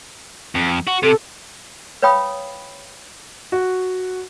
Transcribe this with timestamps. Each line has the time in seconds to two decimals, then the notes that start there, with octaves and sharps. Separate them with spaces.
0.55 F2
0.87 F#4
1.03 C3 A4
2.02 B4 C#5 F5 G5 B5 D#6
3.52 F#4